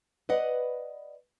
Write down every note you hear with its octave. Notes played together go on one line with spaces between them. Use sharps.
B4 D5 D#5 F#5